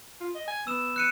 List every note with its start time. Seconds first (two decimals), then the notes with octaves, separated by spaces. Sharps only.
0.21 F4
0.35 D#5
0.48 G#5
0.67 B3 E6 E7
0.96 F#6 C#7 D#7